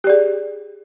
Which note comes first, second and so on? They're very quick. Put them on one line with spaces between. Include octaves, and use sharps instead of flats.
G4 D5 G#4